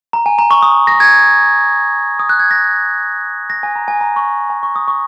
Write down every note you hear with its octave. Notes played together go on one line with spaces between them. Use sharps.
A#5
G#5
A#5
C#6
D#6
A#6
G#6
D#6
F#6
G#6
A#6
A#6
G#5
A#5
G#5
A#5
C#6
G#5
C#6
D#6
C#6